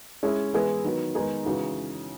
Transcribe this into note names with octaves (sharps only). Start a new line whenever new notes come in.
G#3 C#4 E4 G#4
E3 G#3 B3 E4 G#4
D#3 F#3 B3
D#3 G#3 B3 D#4 G#4
C#3 E3 G#3 D#4 F#4